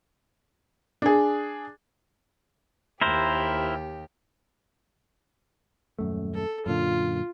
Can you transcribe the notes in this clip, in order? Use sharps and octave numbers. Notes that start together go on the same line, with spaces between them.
D4 G#4
D#2 E4 G4 A#4 C5
D#1 F#2 A3
A4
F#2 A#2 D3 F4